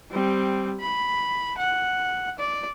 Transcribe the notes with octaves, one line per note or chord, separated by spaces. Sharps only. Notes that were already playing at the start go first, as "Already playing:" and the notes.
G3 C4
B5
F#5
D5